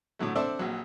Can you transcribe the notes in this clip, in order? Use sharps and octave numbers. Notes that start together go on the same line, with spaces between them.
A2 D3 F#3 A3
C4 D4 A4 C5 D5 E5
A#1 F#3